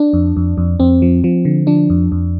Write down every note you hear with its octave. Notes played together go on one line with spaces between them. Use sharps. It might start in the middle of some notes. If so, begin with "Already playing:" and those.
Already playing: D4
F2
F2
F2
F2 C4
F3
F3
D3
F3 D4
F2
F2